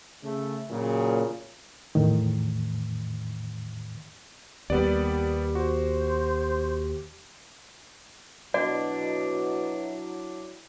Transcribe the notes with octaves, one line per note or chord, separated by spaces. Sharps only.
C#3 A3
A#2 C#3 F#3
E2 A2 D#3
D#2 G3 B3 G4 D5
F#4 C5
B2 F#3 D4 E4 D5